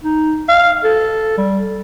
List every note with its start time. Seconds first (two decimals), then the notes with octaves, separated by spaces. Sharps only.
0.03 D#4
0.48 F5
0.84 A4
1.38 G3